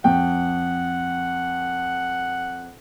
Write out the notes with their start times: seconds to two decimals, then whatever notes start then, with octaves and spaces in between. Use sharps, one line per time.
0.04 F2 F#5 G5